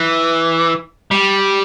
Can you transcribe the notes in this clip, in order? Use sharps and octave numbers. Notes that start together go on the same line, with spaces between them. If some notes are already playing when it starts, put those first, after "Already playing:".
Already playing: E3
G3